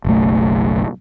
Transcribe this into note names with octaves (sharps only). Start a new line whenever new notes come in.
F#1 B1 A3